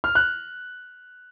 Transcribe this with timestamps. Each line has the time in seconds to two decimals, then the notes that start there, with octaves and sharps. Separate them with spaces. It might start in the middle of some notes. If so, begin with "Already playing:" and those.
0.04 F6
0.15 F#6